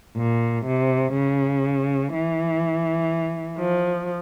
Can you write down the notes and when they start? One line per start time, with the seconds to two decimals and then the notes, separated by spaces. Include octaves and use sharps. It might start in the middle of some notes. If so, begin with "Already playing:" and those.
0.17 A#2
0.66 C3
1.14 C#3
2.13 E3
3.59 F3